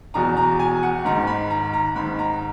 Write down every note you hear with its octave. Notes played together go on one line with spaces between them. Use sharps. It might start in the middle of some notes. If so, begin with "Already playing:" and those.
E2 B2 A#5
A#5
G#5
F#5
G#2 D#3 A#5
B5
A#5
A#5
G#2 D#3 B5
A#5